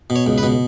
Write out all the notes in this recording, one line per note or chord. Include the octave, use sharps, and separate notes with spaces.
B2
C#5
C#2
B4
B2